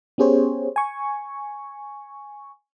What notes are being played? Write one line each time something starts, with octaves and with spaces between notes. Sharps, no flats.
B3 C#4 G4 G#4 C5 C#5
G#5 C#6